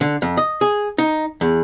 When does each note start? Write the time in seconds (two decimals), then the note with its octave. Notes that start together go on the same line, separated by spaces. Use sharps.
0.01 D3
0.22 F2
0.37 D#5
0.61 G#4
0.98 D#4
1.41 E2